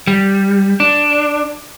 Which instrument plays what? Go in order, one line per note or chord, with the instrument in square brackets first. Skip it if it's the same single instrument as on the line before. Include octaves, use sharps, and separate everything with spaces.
[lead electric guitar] G3
D4